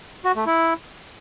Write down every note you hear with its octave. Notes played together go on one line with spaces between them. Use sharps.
F#4
A3
E4